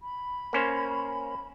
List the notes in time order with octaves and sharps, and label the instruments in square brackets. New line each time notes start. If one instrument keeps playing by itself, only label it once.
[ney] B5
[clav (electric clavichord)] A#3 C#4 C5